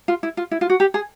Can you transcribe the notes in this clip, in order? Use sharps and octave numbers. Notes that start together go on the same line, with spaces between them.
F4
E4
F4
E4
F4
F#4
G4
G#4